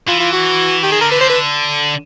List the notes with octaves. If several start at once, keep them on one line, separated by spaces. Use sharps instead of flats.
E3 F4
F4
F#4
D#3 G4
G#4
D3 A#4
B4
C5
B4